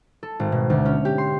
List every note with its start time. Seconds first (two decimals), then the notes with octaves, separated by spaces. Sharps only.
0.23 A4
0.40 G#1
0.52 B2
0.70 D2
0.85 C#4
1.05 G4
1.18 C6